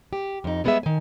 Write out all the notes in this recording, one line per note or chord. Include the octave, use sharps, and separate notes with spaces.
G4
F2 D#4
G3 G#3 B3 F#4 G#4 E5
D#3 G#5